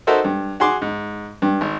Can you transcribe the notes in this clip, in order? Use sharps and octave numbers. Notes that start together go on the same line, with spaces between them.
D#4 F#4 A4 A#4 C5 E5
G2
F#4 G#4 C6 D6
G#2
G2
G#1